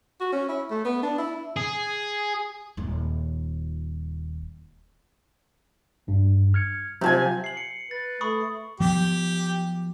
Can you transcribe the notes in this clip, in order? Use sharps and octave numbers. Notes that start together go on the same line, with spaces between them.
F#4
C#4
E4
A3
B3
D4
E4
G#4
D#1 F4
G#1 G2
F6 G#6 C#7
C3 F3 F#3 G#5
C7 F#7
C#7
B4 A6
A3 B5 C#6 D#6
F3 F#3 B3 G4